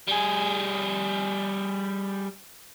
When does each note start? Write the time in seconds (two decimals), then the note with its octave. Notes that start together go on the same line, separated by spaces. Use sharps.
0.07 G3 G#4